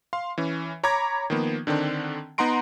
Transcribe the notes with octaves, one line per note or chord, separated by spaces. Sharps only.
F5 C6
E3 C#4
C#5 A#5 B5 D6 G#6
D#3 F3 A#3 B3
D3 D#3 C4 D4
B3 D#4 F#5 A#5 C6 D7